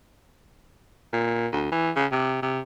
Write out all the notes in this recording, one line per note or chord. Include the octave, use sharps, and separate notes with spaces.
A#2
D2
E3
C#3
C3
C3